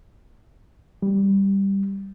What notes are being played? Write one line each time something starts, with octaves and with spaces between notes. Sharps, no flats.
G3